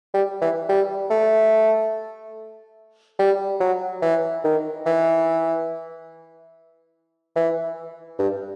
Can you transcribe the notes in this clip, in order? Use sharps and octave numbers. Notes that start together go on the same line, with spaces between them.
G3
E3
G3
A3
G3
F#3
E3
D#3
E3
E3
G2